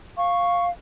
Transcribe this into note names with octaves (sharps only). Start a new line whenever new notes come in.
F5 C#6